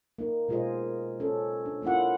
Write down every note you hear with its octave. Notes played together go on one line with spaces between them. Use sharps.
A#3 D#4
B2 G#3 F4 G#4 C5 D#5
C#4 A4
D4
A#3 C#4 E4 F4 F#5